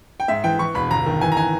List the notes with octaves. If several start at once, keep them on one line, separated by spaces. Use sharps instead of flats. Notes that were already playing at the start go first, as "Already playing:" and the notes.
G5
G#2 E5
E3 G5
E3 C#6
E1 B5
G1 A#5
D#3
E3 G#5
A#5
E3 G#5